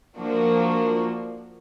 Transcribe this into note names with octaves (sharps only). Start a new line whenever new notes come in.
F3 A#3 D4 F#4